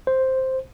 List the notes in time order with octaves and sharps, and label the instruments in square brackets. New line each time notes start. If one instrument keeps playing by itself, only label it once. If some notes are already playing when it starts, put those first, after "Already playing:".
[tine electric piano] C5